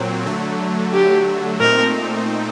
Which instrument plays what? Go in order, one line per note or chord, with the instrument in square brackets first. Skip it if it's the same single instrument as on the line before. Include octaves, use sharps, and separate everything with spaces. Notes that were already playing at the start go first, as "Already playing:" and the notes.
Already playing: [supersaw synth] A#2 F#3 C4
D3 F#3 A3
[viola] G4
[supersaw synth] A#2 A3 C4 D#4 [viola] A#4